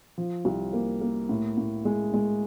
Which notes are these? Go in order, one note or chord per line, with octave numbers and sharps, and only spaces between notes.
F3
C2
A#3
A#3
A2
A2
G#3
G#3